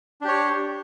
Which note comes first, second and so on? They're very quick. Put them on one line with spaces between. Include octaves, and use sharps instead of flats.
D4 G4 C#5